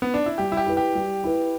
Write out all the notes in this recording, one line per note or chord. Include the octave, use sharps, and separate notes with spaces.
B3
D4
E4
G3 G4
E4
G4
E4 B4
G4
G3
E4 B4